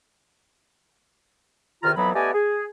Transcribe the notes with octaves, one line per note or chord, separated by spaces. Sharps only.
E2 C3 D#3 F4 A#5 F6
F2 E3 F#3 B3 B5
A3 B3 G4 D5 D#5 G#5
G#4